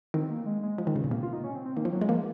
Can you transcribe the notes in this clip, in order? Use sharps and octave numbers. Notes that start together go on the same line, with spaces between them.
D#3 C4
A#3
G#3
G#3
F3
D#3
C#3
A#2
C3 A#3
F4
D#4
C#4
C4
C4
D#3 A#3
F3
F#3
G#3
F3 A#3